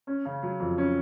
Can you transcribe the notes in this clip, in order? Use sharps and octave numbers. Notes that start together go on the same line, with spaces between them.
C#4
C#3
F#3
F2
C#4